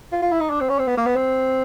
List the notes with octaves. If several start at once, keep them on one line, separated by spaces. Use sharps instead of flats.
F4
F4
E4
D#4
D4
C4
C#4
C4
B3
A#3
B3
C4